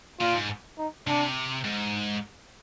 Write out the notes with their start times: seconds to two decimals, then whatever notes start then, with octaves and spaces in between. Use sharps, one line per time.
0.20 A#2 F4
0.35 G#2
0.78 D#4
1.07 C3 D4
1.65 G#2